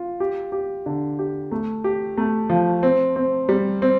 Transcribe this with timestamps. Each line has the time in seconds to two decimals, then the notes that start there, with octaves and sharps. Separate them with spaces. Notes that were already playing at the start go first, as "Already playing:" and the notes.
Already playing: F4
0.20 G4
0.52 G4
0.86 D3
1.19 G4
1.52 A3
1.84 G4
2.17 A3
2.49 F3
2.83 C4
3.16 C4
3.49 G3
3.82 C4